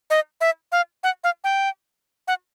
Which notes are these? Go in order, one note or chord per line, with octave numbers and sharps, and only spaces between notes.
D#5
E5
F5
F#5
F5
G5
F#5